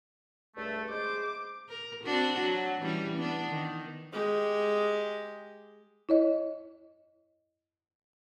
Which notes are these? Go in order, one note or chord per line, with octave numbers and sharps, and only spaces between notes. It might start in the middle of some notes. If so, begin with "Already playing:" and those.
C#2 G2 A3
G#3 C5 D6
A#4
C4 D4 F#4
F#3
E3 G3 C#4
B3 D4
D#3
G#3 G4
E4 C#5 D#5